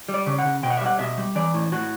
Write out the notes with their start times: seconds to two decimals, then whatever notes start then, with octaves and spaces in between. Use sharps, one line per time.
0.09 G3
0.14 D5
0.26 C#3
0.38 F#5
0.45 C#3
0.63 B2 G5
0.70 F#5
0.77 E5
0.81 G3 F#5
0.99 B2 E5
1.18 G3
1.35 E3 D5
1.54 A2
1.72 A2 F#4